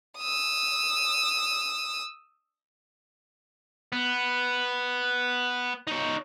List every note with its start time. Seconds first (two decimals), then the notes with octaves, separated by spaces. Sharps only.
0.18 D#6 E6
3.93 B3
5.87 D#4 C#5